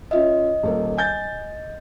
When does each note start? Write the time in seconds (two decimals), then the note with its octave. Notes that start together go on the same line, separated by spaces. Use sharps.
0.11 C#4 F4 D#5 E5
0.63 D#1 A#3 A4
0.97 G#5 G6 A6